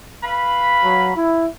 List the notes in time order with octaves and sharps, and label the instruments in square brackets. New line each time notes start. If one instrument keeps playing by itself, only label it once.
[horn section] B4 F5 B5
[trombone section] F#3
E4